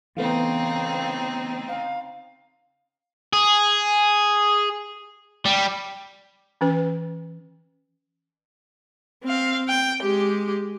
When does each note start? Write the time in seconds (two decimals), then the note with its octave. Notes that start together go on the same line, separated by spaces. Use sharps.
0.17 C#3 E3 A3 B3 C4 D#4 F5
1.68 F5
3.33 G#4
5.45 G3
6.61 E3 C#4 B4
9.23 C4 F5
9.69 G5
10.02 G#3 G4